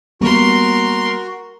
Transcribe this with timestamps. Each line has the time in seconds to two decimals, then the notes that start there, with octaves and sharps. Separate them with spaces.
0.21 G3 A#3 B3 F#4 A#4 C6